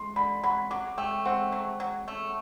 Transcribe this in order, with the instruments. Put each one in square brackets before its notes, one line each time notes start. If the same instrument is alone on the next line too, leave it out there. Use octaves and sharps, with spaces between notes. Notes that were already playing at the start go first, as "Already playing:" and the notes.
Already playing: [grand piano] C6
[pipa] D3 [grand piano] B5
[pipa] F#3 [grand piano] B5
[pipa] F#3 [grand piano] D6
[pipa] A3 [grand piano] G5
[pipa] C4 [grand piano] F#5
[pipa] F#3
F#3
A3